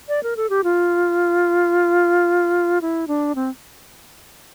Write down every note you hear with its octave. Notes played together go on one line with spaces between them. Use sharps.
D5
A#4
A4
G4
F4
E4
D4
C4